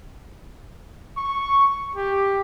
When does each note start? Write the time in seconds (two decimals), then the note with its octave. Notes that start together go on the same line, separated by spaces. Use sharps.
1.17 C#6
1.96 G4